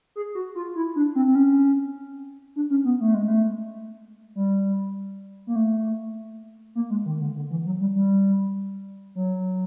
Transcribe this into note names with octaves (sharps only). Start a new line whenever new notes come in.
G#4
F#4
F4
E4
D4
C4
C4
C#4
D4
C#4
B3
A3
G#3
A3
G3
A#3
A3
A#3
G#3
D#3
D3
D3
E3
F#3
G3
G3
F#3